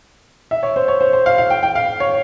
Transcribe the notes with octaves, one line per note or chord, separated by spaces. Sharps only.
E5
C#5
C5
C#5
C5
C5
F5
F5
G5
G5
F5
C#5